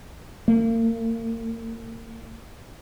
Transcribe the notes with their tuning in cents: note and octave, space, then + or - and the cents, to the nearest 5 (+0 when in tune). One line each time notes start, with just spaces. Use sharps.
A#3 -35